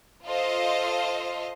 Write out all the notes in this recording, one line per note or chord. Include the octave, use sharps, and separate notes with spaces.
F4 A4 C5 D#5 F5